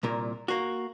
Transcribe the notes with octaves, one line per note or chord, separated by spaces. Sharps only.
C2 A#2 A#4
A#3 F#4